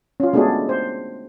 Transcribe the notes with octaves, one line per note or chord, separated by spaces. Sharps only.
C#4 F4
G#3 A3 B3 D4 F#4 G#4
C5